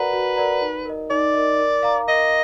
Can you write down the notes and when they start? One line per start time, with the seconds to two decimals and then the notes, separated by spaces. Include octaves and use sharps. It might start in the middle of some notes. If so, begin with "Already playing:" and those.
Already playing: F#4 A#4 B4 D5 F#5 A#5
0.13 F#4
0.36 A#4 D5 F#5 A#5
0.61 D#4
0.85 A#4 D#5
1.10 D#4 D5
1.34 A#4 D#5
1.59 A#4
1.83 F5 A#5 D6
2.08 A#4 D#5